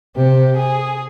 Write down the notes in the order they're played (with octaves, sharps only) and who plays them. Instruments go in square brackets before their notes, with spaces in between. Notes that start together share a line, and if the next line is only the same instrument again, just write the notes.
[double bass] C3 [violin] G4
[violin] G#4